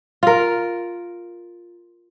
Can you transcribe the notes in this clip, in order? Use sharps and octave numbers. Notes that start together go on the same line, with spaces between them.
F4 A#4